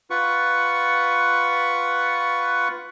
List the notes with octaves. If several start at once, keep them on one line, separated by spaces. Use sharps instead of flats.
F4 B4 F#5 C#6